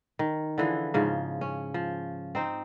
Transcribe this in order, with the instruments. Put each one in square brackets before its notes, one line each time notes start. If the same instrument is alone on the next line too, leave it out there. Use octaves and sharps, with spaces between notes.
[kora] D#3
D3 E3 F3 G#4
G#2 C#3 F3
C#4
F3
C4 D#4 C5